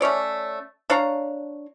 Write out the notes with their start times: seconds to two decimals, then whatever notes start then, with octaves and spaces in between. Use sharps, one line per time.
0.01 A3 C#4 C#5 D5
0.90 D4 C#5 F5 A#5